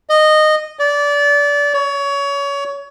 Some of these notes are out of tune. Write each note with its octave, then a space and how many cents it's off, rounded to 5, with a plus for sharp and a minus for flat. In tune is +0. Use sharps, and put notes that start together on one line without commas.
D#5 -15
D5 -25
C#5 +25